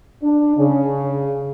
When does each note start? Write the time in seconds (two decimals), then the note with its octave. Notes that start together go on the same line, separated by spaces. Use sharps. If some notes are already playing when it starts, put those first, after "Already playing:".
0.22 D4
0.57 C#3